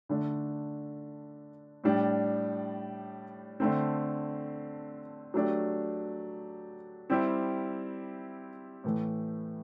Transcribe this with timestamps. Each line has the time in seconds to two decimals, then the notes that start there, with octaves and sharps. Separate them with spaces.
0.09 D3 A3 D4
1.84 A2 G3 D4 G4
3.60 D3 A3 C4
5.34 F#3 A3 D4 G4
7.10 G3 C4 E4 G4
8.84 A2 E3 A3